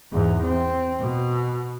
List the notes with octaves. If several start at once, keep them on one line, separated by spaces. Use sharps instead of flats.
E2 G#2
C4
B2